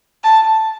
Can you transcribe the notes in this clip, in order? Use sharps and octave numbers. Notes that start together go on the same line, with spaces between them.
A5